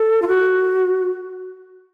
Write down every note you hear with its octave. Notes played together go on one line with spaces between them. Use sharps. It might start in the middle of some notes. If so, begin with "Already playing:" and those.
Already playing: A4
F4
F#4